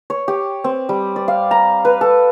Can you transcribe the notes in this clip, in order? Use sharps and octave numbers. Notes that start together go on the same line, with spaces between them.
C#5
G4
C4
G3
D5
F5
A#5
B4
A4